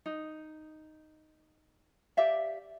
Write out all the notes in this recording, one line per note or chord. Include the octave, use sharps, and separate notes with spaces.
D#4
G4 D5 E5 F5